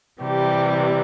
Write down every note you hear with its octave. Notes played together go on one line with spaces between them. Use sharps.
C3 E3 G3 G4